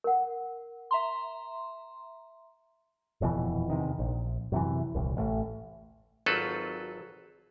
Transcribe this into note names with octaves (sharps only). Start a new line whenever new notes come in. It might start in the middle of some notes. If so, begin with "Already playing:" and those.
A#4 F#5
E5 A#5 C6
D#1 F2 B2 E3
E2 C3 D#3
A#1
F#2 C3 E3
D#1 C2
A1 A2
G#1 F#3 C4 F4 A4 B4